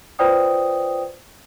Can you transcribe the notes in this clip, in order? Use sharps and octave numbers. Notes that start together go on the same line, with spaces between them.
F4 B4 C5 D5 G5 D#6